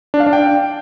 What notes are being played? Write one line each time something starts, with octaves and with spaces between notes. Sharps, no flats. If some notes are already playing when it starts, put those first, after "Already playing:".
D4
F5
D4
G5